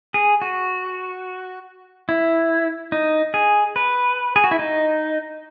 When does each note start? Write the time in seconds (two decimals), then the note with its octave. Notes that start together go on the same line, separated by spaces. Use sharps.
0.14 G#4
0.42 F#4
2.09 E4
2.92 D#4
3.34 G#4
3.76 B4
4.36 G#4
4.44 F#4
4.51 E4
4.59 D#4